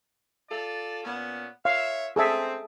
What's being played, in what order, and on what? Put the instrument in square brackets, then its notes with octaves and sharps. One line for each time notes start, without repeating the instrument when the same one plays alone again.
[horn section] F4 A4 D5
A#2 B3 C#4
[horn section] C#5 E5 [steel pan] F5
[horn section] C4 [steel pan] G#4 A4 E5